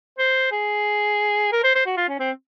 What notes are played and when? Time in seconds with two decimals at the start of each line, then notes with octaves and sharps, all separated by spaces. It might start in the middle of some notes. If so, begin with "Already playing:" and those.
0.19 C5
0.52 G#4
1.52 A#4
1.64 C5
1.75 C5
1.86 F#4
1.97 F4
2.09 C#4
2.20 C4